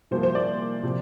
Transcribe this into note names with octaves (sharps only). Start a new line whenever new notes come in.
C2 A#2 F3 C5
C5
D5
C3 F3